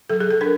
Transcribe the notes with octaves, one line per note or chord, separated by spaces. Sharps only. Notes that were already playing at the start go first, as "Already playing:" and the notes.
F#3 A4
G#4
A4
D4 A#4